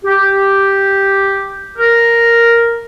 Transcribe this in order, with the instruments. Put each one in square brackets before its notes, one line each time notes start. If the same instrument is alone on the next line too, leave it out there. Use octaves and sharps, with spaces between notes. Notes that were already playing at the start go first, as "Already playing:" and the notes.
[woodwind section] G4
A#4